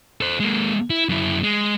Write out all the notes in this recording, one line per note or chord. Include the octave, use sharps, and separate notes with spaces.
A4 C5
G#3 A#3
E4
F#2 E4
G#3